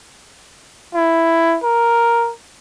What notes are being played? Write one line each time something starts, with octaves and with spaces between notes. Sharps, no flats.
E4
A#4